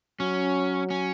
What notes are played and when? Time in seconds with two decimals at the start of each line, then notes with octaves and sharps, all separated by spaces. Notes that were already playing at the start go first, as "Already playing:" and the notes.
0.20 F#3 C#4
0.90 C#4